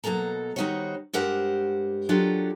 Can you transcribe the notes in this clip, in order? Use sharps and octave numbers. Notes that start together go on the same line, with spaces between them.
B2 F#3 A#3 A4 A#5
D#3 G3 D#4 F#4 C5 C#5
G2 G#3 G4 A#4 C5 F#5
F#3 D4 F4 G4 A4 A#4